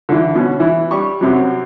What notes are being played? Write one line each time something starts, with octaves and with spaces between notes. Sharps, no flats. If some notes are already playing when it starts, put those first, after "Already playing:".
D3 E3
B2 C#4
E3
G3 G4 C#6
F#2 C3 F#3